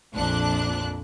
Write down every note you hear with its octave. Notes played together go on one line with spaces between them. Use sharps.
A#1 F2 A#2 D4 F#6